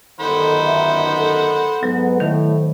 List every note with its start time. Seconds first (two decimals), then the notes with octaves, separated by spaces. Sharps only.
0.20 G1 F#2 D#3 A4 C5 F#5 B5
0.65 E5
1.16 A4
1.83 G#2 F#3 B3
2.20 A2 D#3 C5